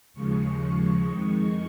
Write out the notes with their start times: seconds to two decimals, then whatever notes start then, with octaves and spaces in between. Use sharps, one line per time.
0.14 D#2 C#3 F3 G#3 C#6
0.58 C#6
1.03 F2 D#3 G#3